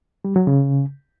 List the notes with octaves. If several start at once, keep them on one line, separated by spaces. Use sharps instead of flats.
G3
F#3
C#3